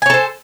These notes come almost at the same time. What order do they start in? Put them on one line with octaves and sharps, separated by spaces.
G#5 C#5 A4 C5